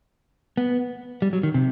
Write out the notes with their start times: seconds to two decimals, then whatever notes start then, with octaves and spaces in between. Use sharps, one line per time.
0.57 B3
1.22 G3
1.33 F#3
1.43 D#3
1.54 C3